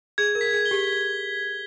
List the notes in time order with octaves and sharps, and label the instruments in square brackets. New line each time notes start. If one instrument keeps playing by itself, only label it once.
[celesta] G#4 [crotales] G#6
[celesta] A#4
[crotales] B6
[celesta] G#4
[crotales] G7
[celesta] G4